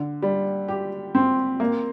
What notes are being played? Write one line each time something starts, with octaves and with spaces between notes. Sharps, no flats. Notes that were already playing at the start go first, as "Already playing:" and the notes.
Already playing: D3
G3
G4
C4
A#3